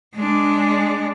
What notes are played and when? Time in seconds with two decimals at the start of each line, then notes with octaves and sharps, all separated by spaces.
0.15 G#3 D4